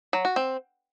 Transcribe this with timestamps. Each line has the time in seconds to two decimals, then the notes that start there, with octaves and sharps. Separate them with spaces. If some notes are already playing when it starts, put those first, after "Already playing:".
0.13 F#3
0.25 F#4
0.36 C4